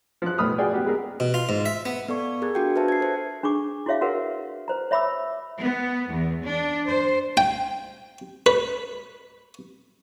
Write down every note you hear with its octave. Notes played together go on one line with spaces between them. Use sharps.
F3 F#6
B1 A2 B5 D#6 F6
F#4 G#4 D5 G5 G#5
B3 G4
G#3 B3 G#4 A#4
B2
F4
G#2
E5
B3
B3 A4 D5 C#6
G#4 A#4 F#6 G#6
D4 F4 F#4 F5 G5 G6
B4 C5 E5 A5
G#6 C7
A4 C5
D4 G#4 C#6 D6
E4 F#4 G#4 C#5 E5 F5
F#4 G#4 A#4 B4 F5 F#5
B4 C5 A#5
C#5 E5 B5 D6 E6
B3
E2
D4
C5
G5
B4